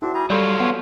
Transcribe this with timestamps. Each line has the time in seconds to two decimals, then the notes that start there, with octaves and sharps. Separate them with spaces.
0.02 C4 D4 E4 F#4
0.14 G3 G#4 A#5
0.30 F#3 G3 F4 A4 C#5 F5 C6 G6
0.60 B3